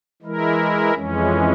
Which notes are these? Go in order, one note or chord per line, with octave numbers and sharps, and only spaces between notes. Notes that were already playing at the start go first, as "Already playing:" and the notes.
E3 G#3 E4 A#4
F2 E3 G#3 C#4